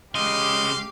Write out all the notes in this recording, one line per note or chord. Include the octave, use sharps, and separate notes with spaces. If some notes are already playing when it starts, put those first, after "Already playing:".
C#3 G#3 G4 D#5 F5 C6 D6